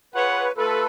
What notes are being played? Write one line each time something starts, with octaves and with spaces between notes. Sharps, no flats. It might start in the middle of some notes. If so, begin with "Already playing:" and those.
F4 G#4 B4 C#5 F#5
A3 F4 A4 B4